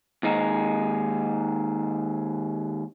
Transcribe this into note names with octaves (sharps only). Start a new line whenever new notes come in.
D#2 G#3 D#4